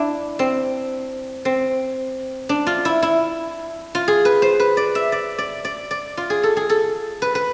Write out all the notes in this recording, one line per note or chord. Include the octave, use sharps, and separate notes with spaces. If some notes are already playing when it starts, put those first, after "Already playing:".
Already playing: D4 E4
C4
C4
D4
F4
E4
E4
F4
G#4
B4
C5
B4
D5
E5
D5
D5
D5
D5
F4
G#4
A4
G#4
A4
B4
B4